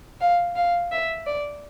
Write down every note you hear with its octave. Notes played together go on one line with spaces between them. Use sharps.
F5
F5
E5
D5